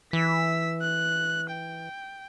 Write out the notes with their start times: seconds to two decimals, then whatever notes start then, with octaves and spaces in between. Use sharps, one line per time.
0.13 E3 E6 B6
0.82 F#6
1.51 G5